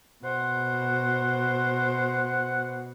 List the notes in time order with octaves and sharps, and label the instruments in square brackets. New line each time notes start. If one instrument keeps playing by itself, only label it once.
[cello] B2 [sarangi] C5 [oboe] F#5